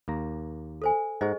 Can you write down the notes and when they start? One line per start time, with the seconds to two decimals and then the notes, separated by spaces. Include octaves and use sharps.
0.08 D#2 A#3 A#5
0.82 A4 C5 G#5
1.21 G#2 G#4 C5 D#5 F#5 A#5